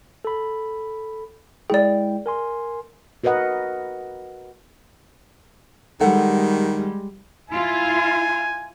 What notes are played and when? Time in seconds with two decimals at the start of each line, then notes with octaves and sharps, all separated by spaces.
0.25 A4 B5
1.70 G#3 E4 G#4 D5 G5
2.26 A#4 G#5 C6
3.24 F#4 A#4 B4 D#5 F#5
6.00 D#3 G3 G#3 A4 F#5
7.50 E4 F4 G#5